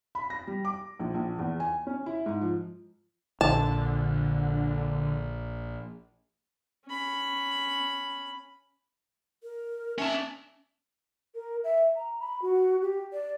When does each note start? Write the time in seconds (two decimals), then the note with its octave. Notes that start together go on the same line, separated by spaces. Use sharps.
0.15 B5
0.30 A#6
0.47 G3
0.65 D6
0.99 A#1
1.14 A#1
1.38 E2
1.60 G#5
1.87 C#4
2.06 E4
2.26 G#2
2.41 F3
3.41 A#1 D3 A5
6.86 C#4 B5
9.43 A#4
9.98 C#4 E5 A5
11.35 A#4
11.64 E5
11.96 A#5
12.20 B5
12.42 F#4
12.82 G4
13.13 D5